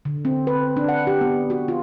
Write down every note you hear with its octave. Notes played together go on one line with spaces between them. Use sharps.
D3
C4
B4
D4
F#5
G4
B3
F#4
F4